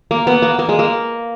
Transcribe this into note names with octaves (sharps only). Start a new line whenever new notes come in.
A#3
B3
A#3
A#3
G#3
A#3